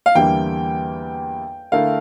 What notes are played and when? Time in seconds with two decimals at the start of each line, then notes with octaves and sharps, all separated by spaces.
0.06 F5
0.15 E2 D3 G3 A#3 E4 G5
1.72 D3 A3 E4 A#4 F5